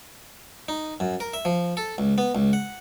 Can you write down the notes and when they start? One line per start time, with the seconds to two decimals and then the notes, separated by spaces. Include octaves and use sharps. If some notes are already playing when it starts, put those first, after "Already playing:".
0.68 D#4
1.00 F#2
1.20 A#4
1.34 E5
1.45 F3
1.77 A4
1.98 C#2
2.18 B3
2.35 C#2
2.53 F#5